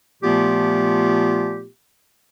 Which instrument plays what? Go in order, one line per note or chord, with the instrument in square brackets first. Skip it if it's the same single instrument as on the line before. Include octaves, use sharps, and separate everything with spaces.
[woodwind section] A#2 F3 A3 B3 F4 G4